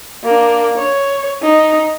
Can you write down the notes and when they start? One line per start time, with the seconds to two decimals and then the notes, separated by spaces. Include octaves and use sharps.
0.24 A#3 D4
0.78 C#5
1.42 D#4